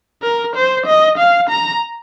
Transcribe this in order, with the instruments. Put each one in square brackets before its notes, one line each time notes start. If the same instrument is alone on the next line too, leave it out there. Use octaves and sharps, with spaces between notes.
[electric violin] A#4
C5
D#5
F5
A#5